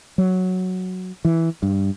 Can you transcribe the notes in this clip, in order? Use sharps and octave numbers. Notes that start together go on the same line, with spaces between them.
F#3
E3
G2